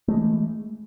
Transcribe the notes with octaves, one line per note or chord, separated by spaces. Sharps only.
E3 G#3 A3